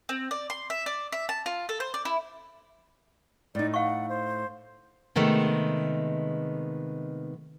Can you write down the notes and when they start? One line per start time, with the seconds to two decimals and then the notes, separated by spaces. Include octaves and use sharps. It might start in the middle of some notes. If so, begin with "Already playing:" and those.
0.09 C4
0.31 D5
0.50 C6
0.70 E5
0.86 D5
1.12 E5
1.29 A5
1.46 F4
1.69 A4
1.80 C5
1.94 D5
2.05 E4
3.55 A2 D#4 D5
3.74 F5 F#5 C#6
4.09 C5
5.15 C3 D#3 G#3 A3 B3